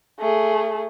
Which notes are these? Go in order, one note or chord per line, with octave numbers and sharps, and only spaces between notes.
A3 G#4